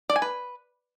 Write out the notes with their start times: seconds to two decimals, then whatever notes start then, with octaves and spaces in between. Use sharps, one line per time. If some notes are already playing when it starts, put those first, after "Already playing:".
0.10 D5
0.16 G#5
0.22 B4